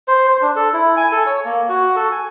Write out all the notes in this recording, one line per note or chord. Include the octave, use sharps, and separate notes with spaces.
C5
C5
D4
A4
E4
G#5
A4
C#5
A#3
F#4
A4
G#5